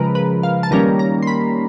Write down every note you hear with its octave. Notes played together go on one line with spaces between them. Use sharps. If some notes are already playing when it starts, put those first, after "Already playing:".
Already playing: C#3 F3 G#3 A#4 B4
B4
F5
A5
D#3 G3 A#3 C#4 A#5
A#5
C6
B5